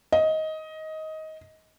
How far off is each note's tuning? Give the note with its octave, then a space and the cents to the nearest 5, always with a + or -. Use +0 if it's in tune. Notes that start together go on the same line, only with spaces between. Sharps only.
D#5 +15